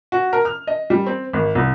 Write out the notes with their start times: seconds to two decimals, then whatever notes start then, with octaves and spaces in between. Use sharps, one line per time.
0.12 F#4
0.33 A#4
0.45 F6
0.67 D#5
0.90 G3
1.06 C4
1.33 G#1
1.55 C2